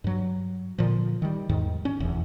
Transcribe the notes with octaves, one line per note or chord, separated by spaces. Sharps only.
G2 F#3
A#2 D3 F3
D#3 G3
E2 G#2 D#3
C#4
F1 B1 E2